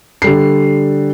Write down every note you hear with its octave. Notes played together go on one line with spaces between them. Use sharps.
D3 G3 C7